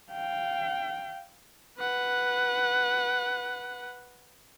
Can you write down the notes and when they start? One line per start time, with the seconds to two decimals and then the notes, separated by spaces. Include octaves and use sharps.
0.12 F5 G5
1.79 B4 F#5